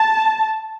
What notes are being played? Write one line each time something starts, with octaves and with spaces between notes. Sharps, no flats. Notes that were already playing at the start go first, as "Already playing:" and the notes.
Already playing: A5